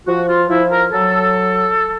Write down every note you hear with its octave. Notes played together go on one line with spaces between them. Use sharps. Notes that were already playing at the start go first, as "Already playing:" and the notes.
F3 F#4
F4
F3 E4
A#4
F#3 A4